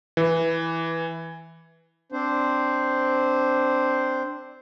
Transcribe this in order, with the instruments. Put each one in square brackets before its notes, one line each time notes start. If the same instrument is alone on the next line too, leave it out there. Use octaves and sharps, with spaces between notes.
[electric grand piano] E3
[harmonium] C4 D4 C5